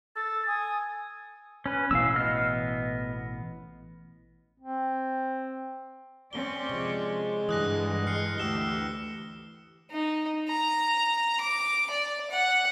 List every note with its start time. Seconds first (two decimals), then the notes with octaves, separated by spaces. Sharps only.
0.16 A4 A6
0.47 G#5 D#6
1.66 C#4 B4
1.91 A1 B2 E3 F5 E6
2.15 B3 D#5 F6
4.60 C4
6.33 C4 C#4 D5 G7
6.69 C3 F3 G#3
7.49 G2 D3 E3 D#6 F#6 A#6
8.07 E3 F6 C7 C#7
8.38 D2 G4 E6 E7 G7
9.91 D#4
10.49 A#5
11.41 D6
11.90 D5
12.31 F#5